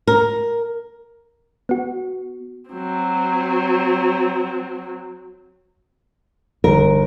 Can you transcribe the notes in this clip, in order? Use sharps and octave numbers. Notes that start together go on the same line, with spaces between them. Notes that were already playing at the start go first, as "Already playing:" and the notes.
A#4
B3 F#4
F#3 C4
G1 A#4